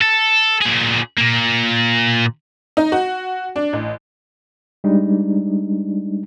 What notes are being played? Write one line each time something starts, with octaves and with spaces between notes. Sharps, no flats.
A4
A#2 G#4
A#2 A#3
D#4
F#4
D4
A1
G3 G#3 D4 D#4